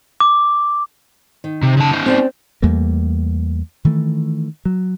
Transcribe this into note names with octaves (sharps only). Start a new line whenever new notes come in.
D6
D#3
C3
C#3 A5
C#4 D#4
C4 G4 D5
E2 G3 A3 A#3
D#3 E3 A3
F#3